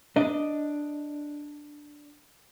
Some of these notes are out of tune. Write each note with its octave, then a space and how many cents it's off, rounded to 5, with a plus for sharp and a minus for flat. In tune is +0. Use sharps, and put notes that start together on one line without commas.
D4 +5 D#5 +0